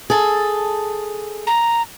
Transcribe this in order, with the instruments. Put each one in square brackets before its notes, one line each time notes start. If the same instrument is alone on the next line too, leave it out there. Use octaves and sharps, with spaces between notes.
[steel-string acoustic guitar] G#4 A4
[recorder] A#5